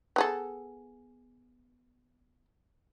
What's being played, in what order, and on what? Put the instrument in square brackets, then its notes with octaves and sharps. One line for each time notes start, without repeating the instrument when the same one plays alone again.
[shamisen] B3 G#4 A4